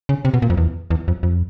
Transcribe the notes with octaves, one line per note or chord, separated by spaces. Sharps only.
C#3
C3
B2
A#2
F2
E2
E2
F2
F2